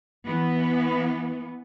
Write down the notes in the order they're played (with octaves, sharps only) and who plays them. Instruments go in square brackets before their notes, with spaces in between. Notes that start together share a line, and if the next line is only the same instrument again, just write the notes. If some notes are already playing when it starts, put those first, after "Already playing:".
[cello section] E3 B3